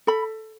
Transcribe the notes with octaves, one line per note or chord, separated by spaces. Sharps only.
A4 B5